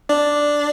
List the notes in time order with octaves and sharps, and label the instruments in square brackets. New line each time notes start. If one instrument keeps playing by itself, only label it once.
[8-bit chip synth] D4 D5